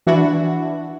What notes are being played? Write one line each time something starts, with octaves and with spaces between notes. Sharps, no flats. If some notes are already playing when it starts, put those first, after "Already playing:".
E3 D4 E4 F#4